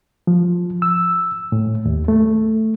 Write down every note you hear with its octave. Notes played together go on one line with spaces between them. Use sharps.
F3
E6
A2
D#2
A3